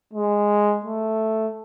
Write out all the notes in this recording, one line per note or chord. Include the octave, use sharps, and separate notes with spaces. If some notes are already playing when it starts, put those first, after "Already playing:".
G#3
A3